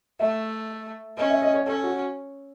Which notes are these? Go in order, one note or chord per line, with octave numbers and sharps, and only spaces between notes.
A3 E5
C#4 D#5
E5
D#5
C#5
C#4 A4
F#4